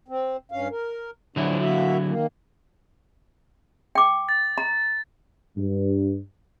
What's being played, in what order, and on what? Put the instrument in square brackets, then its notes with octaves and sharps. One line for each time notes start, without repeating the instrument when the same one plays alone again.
[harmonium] C4
G2 C#4 F5
A#4
[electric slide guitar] D3 F#3 E4 [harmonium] F3 D4 F#4
[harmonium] A#3 F#4 E5
D#3 A#3
[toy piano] G5 D6
[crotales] A6
[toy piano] A#5
[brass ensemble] G2